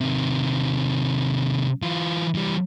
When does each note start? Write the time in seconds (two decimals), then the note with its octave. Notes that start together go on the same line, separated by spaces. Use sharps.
0.01 C3 D#3
1.82 E3 F4
2.35 E3 G3